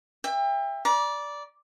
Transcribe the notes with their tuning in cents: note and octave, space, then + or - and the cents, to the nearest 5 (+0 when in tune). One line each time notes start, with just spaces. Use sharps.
E5 +10 G5 +35
D5 -10 A#5 +45